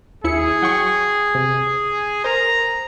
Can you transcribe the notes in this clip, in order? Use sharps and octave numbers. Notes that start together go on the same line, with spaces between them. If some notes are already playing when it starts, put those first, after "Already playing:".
D#2 E4 G#4 C#7
F#3 G5 C#6
C3
A#4 C5 A#5